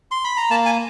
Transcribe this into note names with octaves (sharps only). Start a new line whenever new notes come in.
C6
B5
A#5
A#3 A5
G#5